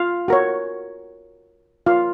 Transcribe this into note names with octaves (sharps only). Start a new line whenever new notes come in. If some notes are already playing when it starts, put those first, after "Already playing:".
Already playing: F4 F5
F#4 A#4 C#5
F4 A#4 C#5 F5